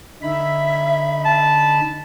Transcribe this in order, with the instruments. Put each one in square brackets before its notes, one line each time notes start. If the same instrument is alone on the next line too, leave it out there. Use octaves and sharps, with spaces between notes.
[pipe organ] D3 D#4 B5 [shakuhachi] E5
[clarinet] A5